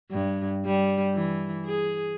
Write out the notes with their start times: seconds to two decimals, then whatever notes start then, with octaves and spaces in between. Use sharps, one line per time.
0.11 G2
0.65 G3
1.14 E3
1.65 G#4